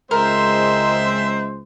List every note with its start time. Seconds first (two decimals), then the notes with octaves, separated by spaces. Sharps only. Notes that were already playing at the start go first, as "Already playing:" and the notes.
0.11 C#2 G#3 C4 A#4 C5 E5